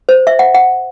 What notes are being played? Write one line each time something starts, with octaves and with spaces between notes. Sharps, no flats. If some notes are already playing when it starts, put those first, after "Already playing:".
C5
E5
F#5
F#5